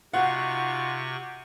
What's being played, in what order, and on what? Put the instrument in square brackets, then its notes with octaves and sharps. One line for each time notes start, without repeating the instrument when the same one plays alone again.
[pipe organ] C3 C#6 [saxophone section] D#4 F4 F#4 [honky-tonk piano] F#5